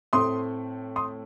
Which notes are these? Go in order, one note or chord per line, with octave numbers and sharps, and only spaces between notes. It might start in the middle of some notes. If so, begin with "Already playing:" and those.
A2 A3 C4 C6 D#6
C6 D#6